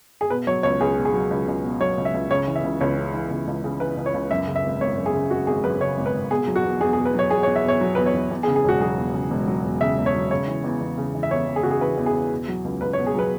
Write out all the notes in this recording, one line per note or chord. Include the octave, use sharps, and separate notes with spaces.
G#4
B2 B4
F#3 C#5
C#2 C#5
C#2 G#4
B2
G#4
F#3
C#2
C#2
B2
F#3 C#5
C#2
E5
C#2
C#3 C#5
E3
E5
C#2
C#2 C#5
C#3
E3
C#2
C#2
C#3
E3 B4
C#2
C#5
C#2
F#2 E5
C#3
E5
G#1
G#1 C#5
F#2
G#4
C#3
G#1 F#4
G#1 G#4
F#2 B4
C#3 C#5
G#1
B4
G#1
B2 G#4
F#3
F#4
E2
E2 G#4
G#4
B2
B4
F#3 C#5
E2 G#4
C#5
E2
E5
B2 C#5
F#3
E2 B4
C#5
E2
E2
G#4
C#3
G#4
E1 F#4
F#3 G#4
E2
C#3
E1
F#3
E2
C#3 E5
E1
C#5
F#3
C#3 C#5
E3
E2
E2
C#3
E3
E5
E2 C#5
E2
G#4
C#3 F#4
G#4
E3 B4
E2
G#4
E2
B2
F#3
C#2
C#2 B4
C#5
B2
G#4
F#3 B4